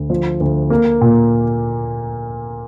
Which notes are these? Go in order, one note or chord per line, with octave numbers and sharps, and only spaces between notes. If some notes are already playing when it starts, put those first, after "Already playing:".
Already playing: D2
F3
D2
A#3
A#2